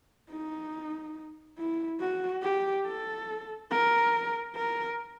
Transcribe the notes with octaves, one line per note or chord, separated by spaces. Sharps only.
D#4
E4
F#4
G4
A4
A#4
A#4